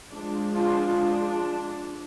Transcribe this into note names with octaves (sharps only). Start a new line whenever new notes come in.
F3 G#3 D4
D4 F4
D4